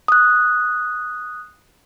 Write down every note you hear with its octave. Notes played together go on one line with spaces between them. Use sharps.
D#6 F#6